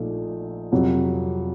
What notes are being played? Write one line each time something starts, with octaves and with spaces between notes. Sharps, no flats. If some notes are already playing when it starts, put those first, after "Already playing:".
Already playing: A#1 A#2 A3 D#4
F2 C3 F#3